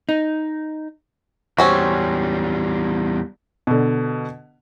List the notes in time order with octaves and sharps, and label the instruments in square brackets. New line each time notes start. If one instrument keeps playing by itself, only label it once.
[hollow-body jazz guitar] D#4
[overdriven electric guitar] E2 G3 [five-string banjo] C4 C#4 F#4
[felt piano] B2 D3